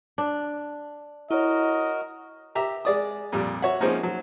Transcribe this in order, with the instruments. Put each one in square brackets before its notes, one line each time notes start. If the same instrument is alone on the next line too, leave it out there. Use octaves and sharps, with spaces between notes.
[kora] D4
[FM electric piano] E4 C#5 [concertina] F#4 A#4 [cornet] D#5
[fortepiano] G4 E5 A#5
G#3 D5 D#6
F2 A#2 G3
F#4 C#5 E5 F#5
F3 G#3 A#3 C4 C#4 D#4
F#3